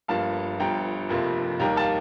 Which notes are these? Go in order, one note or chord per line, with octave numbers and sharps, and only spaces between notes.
G1 G2 F3 A#3 F5 A5
G1 G2 F3 G5 A#5
F1 F2 C3 F3 A#3
D#2 D#3 G3 A#3 G5 A#5
F5 A5